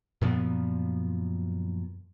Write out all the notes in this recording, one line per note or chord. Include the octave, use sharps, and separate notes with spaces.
F#2 A#2 F3 B3